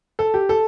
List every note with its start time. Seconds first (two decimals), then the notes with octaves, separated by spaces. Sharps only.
0.19 A4
0.34 G4
0.49 A4